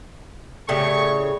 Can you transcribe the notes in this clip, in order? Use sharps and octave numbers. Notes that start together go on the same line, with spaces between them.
A2 C#3 A3 G4 C#5 D5 G5 C#6